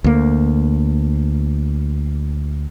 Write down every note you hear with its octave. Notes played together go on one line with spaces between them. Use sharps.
D2 A#3